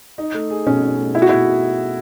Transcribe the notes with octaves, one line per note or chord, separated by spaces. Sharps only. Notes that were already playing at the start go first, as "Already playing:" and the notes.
D#4
A3
G#4
B2 C#4
D#4
A3
E4 G#4
F#4
B2 E4